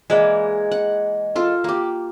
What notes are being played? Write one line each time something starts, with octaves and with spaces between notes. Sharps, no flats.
E3 G#3 A#3 D5 E5
F#5
F4 A4
A#3 G4